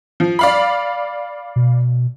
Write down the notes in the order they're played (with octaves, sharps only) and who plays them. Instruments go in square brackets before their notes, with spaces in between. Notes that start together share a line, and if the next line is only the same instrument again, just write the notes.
[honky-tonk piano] F3
D5 F5 B5
[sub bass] B2